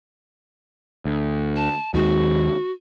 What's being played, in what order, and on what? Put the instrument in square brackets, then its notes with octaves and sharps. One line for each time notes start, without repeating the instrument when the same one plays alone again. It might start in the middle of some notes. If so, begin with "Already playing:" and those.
[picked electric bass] D2
[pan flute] A5
[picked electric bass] D#2 D#3 G#3 [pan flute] F#4